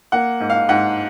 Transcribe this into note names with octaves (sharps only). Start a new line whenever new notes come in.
A#3 F#5
G#2
F5
G#2 F#5